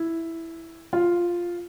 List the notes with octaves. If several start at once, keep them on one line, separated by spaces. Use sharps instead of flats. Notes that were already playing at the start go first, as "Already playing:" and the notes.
Already playing: E4
F4